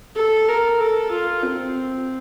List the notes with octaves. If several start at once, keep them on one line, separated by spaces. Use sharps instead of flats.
A4
A#4
A4
F4
C4